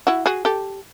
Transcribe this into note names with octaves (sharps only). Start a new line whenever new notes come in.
E4 F#4
F#4 G#4
G4 A4